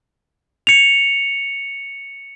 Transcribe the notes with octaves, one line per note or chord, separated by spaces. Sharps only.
C#7 F7